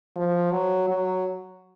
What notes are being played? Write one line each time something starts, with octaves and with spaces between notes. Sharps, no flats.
F3
F#3
F#3